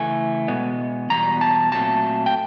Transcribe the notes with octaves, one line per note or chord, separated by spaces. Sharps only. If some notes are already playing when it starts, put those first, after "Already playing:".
Already playing: C#3 E3 A3 G#5
B2 G#3 B3
E2 B2 G3 A#5
A5
A#2 F#3 A3 C4 A5
G5